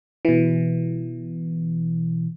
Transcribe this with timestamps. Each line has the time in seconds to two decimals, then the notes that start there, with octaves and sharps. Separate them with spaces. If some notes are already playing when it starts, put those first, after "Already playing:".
0.25 B2 E3